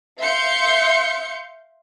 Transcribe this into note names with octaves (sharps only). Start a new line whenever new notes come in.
E5 F5 C6 G6 C#7